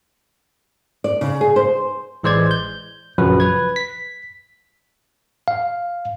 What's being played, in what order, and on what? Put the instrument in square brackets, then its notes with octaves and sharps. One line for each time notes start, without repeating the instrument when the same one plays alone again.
[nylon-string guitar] D5
C#3
G#4
C5
[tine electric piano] A1 E3 G#3 C5 D5 G#6
G6
A#1 F#2 C#3 F3 F#3 B4
B4 G#6
B6
F5